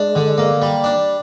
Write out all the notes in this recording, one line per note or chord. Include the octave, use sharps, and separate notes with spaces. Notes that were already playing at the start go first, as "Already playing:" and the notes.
Already playing: G#3 D4
D3
A#3
G3
D4